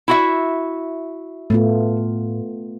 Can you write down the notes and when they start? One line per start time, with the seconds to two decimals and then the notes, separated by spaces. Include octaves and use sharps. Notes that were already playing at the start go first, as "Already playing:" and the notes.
0.08 E4 F#4 E5
1.50 A2 A3 B3 F4